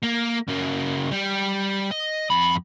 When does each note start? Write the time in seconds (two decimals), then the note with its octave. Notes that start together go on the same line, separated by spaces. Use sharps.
0.03 A#3
0.48 C#3 A#3
1.12 G3
1.91 D#5
2.30 F2 B5